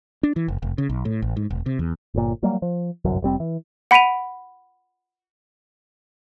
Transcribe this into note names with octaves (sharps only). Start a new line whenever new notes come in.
D4
E3
F#1
F1
C#3
B1
A2
A1
G#2
E1
C3
E2
G1 A#2
F#3 G3 A#3
F3
G1 C2 F#2 F#3
F1 G3 C4
E3
F#5 B5 B6 D7 D#7 F7